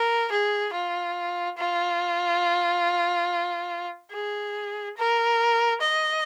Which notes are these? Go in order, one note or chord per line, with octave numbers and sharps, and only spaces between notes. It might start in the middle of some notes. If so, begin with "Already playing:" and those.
Already playing: A#4
G#4
F4
F4
G#4
A#4
D#5